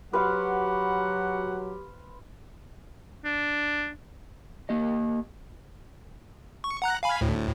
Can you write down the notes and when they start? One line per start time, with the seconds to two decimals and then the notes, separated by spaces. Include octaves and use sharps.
0.13 F#3 F#4 G4 B4 C5 F5 F#5
3.25 D4
4.69 A#3 G4 D#5
6.64 C#6
6.82 F#5 A#5 F#6
7.03 F5 G#5 B5
7.21 D2 A2